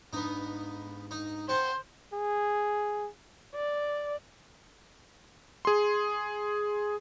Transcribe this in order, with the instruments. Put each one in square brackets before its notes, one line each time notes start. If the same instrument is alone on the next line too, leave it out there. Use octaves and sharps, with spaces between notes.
[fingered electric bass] G#2 D4 [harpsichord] B3 D#4
[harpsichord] D#4
[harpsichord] C4 F#5 A5 [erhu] C5
[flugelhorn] G#4
[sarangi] D5
[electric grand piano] G#4 C6